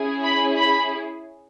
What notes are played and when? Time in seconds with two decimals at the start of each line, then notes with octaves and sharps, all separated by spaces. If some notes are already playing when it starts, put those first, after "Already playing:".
Already playing: C#4 E4 G#4
0.23 B5
0.57 B5